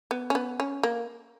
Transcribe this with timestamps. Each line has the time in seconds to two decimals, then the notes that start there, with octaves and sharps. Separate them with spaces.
0.11 B3
0.30 C#4
0.35 B3
0.60 C#4
0.83 A#3